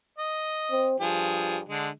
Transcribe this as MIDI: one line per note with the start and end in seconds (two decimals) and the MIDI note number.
0.18 0.89 75
0.71 0.96 60
1.00 1.64 43
1.00 1.59 53
1.00 1.59 68
1.68 1.89 50
1.68 1.89 56